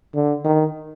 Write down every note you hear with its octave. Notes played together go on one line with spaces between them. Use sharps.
D3
D#3